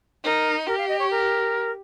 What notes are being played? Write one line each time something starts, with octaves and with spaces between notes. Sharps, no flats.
D#4 A#4
G4 A#4
F5
D#5
C#5
A#4